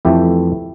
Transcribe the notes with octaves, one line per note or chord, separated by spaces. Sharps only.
F2 E3 A3 E4 G4